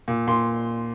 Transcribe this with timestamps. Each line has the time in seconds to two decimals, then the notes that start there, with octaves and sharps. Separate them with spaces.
0.08 A#2
0.27 A#2 C6